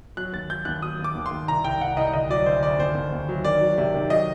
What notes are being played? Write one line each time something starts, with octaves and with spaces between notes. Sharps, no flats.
F#3 F#6
D#2 A6
F#3 G6
D#2 F#6
F#3 D#6
D#2
D6
D#2
C6
D#2
C2 A#5
C2 G5
C2 F#5
C2 D#5
D2 D#5
F#3 D5
D2 C5
D2 D5
D#2 C5
D#2
D#2
F#3
D#3 D5
F#3
C3
D#3
F#3 D#5